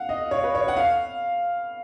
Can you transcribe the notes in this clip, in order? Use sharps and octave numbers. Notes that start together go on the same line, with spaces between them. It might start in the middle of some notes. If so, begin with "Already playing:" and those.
Already playing: F5 F#5
D#5
C#5
B4
C#5
F#5
F5